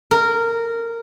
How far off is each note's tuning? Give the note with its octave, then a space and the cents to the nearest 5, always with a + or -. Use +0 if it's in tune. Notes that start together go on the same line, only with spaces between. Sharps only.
A#4 -15